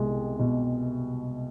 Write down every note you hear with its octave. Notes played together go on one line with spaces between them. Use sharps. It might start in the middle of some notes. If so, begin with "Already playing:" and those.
Already playing: C2 B2 G#3
B2